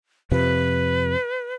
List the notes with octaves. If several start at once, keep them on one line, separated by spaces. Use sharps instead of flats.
F2 C3 F3 B4